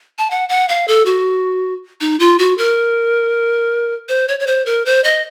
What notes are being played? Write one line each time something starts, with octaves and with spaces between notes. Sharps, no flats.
A5
F#5
F#5
F5
A4
F#4
D#4
F4
F#4
A#4
C5
C#5
C#5
C5
A#4
C5
D#5